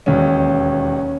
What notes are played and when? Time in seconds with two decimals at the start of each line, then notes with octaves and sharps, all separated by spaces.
0.06 E1 D#2 D#3 C#4